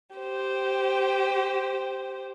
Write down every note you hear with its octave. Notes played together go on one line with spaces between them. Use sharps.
G4 C5